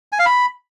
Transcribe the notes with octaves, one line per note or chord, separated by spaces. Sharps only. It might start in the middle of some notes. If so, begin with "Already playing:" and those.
G#5
F5
B5